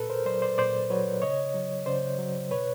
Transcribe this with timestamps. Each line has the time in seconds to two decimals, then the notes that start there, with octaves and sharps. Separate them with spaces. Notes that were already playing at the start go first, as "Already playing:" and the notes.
Already playing: A#2 A4 B4
0.10 A#4 C5
0.25 F#3 C5 D5
0.42 C5 D5
0.58 A#2 C5 D5
0.90 F#3 B4 C#5
1.22 C#3 C#5 D#5
1.54 F#3
1.86 C#3 C5 D5
2.19 F#3
2.51 B2 B4 C#5